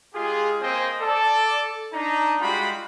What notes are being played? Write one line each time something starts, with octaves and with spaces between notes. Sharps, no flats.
G#3 F4 G4 G#4
A#3 C4 C5 D#5 G5 G#5
A4 D5
D4 D#4 A#5
G3 G#3 F4 F#4 G5 B5